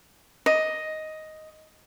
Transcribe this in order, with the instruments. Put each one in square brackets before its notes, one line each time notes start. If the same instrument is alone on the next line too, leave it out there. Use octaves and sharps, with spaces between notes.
[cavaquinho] D#5